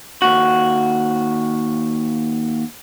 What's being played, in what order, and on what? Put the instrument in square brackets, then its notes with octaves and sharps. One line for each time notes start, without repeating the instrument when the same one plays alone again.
[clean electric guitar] D#2 F#4